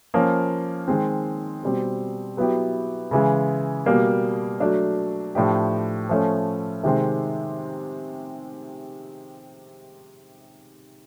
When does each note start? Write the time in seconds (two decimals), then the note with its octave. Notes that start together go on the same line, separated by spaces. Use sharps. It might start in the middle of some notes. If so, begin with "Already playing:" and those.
0.14 F3 A#3 C#4
0.88 D#3 G#3 C4
1.63 B2 G3 C4
2.37 F#3 B3 E4 G4
3.11 C#3 E3 G#3
3.86 B2 G3 A#3
4.60 F#3 A3 D4
5.35 A2 F3 A3 D4 G4
6.09 F3 A3 C#4
6.83 C3 D#3 G#3 C4